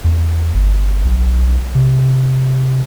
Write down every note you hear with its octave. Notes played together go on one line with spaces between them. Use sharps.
E2
G1
B1
C3